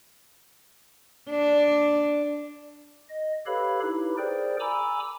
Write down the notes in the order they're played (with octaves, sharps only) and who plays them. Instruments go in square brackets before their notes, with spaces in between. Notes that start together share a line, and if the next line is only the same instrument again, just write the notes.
[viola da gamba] D4
[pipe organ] D#5
G4 A4 B4 C#5 F5 B5
D#4 E4 G4 B4
G#4 A#4 C5 D5 G5
G#5 A#5 B5 D6 E6